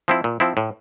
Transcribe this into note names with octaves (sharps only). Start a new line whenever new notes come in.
F3 C4 E4
A#2
F3 C4 E4
A2